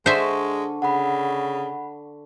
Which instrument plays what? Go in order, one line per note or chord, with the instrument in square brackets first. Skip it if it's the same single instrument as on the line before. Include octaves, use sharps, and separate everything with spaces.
[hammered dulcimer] D3 F5 C#6 [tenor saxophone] G#3 [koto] C5 E5
[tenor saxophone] C#3 [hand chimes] F#5 B5